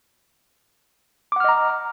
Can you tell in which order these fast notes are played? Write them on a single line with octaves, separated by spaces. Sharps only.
D6 F#5 F6 D#5 A#5